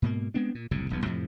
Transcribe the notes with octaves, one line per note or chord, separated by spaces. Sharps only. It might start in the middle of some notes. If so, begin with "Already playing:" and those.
G#2 B2 A#3
G#3 B3 C4 D4
A#2
F#1 C2 A2 C3
D#1 B1 E2 B3
F2 A2 C3 F3